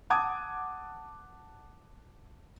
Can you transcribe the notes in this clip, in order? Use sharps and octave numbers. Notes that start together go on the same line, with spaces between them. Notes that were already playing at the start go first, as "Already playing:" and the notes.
F#5 A5 D6 D#6 G#6